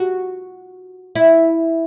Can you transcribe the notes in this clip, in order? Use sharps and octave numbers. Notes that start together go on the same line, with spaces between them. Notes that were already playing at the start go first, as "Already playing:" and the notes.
Already playing: F#4
E4